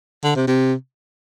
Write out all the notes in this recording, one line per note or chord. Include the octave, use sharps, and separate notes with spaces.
D3
C3
C3